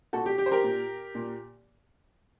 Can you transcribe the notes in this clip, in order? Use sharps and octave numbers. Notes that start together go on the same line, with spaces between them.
A#2 F#4 A4
G4
G4
C5
G4 A#4
A#2
A#2